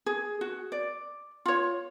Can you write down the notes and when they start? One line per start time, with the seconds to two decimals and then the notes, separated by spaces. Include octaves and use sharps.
0.06 G#4
0.41 F#4
0.72 D5
1.46 F4 C#5